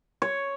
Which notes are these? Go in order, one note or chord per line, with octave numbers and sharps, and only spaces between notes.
C#5